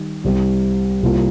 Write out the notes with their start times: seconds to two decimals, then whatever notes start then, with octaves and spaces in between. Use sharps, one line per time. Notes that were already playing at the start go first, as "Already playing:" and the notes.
Already playing: D#3 G3
0.24 C2 C3 G3
1.03 C2 C3 G3 A#3 F4